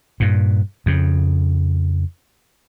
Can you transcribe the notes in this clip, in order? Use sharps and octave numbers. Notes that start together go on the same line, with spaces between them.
G2 A#2
F2 C#3